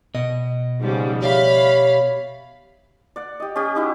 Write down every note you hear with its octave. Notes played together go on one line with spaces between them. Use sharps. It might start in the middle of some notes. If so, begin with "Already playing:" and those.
B2 D#5
G#2 C#3 F3 G3
G4 C#5 D5 E5 F5 B5
D5 F#5
G4 D#5
C#4 G4
D#4 E4 F#4